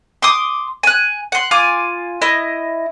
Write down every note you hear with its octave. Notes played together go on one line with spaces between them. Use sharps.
C6 D6 D#6
G#5 F#6
F#5 C6
F4 G#5 D6
E4 D#5